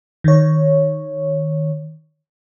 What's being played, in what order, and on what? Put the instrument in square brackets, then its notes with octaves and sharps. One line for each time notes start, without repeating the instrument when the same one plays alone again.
[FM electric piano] D#3 C#5